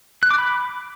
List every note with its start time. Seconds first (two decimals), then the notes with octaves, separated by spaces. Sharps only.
0.23 F#6
0.31 D6
0.38 B5